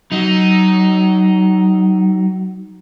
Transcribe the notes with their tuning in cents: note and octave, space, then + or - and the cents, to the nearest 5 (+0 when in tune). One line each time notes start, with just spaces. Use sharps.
F#3 +25 D#4 +0